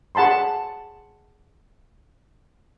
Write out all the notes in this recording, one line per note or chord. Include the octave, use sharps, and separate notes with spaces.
G#4 F#5 A5 B5 C6